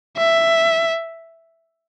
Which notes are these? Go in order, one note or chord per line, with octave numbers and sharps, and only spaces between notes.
E5